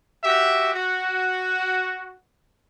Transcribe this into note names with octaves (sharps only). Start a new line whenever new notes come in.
F#4 G4 E5
F#4